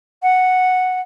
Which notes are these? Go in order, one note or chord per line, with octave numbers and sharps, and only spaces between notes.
F#5